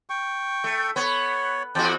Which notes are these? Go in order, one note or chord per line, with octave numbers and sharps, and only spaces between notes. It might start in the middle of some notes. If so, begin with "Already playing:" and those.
G5 C#6
A3
B3 C#5
E2 F#4 G5 A5